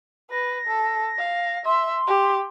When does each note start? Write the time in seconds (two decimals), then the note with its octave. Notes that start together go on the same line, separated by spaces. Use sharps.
0.31 B4 A#6
0.67 A4
1.18 F5
1.65 E5 C6
2.07 G4